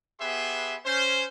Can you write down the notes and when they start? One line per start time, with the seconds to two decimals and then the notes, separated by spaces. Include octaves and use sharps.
0.20 B3 G4 G#4 B4 E5 C6
0.85 C#4 C5